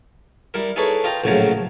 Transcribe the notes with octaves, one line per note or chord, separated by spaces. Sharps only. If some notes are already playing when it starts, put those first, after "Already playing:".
G3 E4 A#4
D#4 E4 G#4 A4 B4 C#5
F4 D#5 G5 A#5
A#1 A2 C#3 F3 F#3 A#5